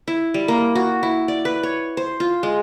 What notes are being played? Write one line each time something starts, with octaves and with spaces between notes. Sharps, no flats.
E4
G3
A#3
F#4
E4
D5
B4
C#5
C5
F4
G#3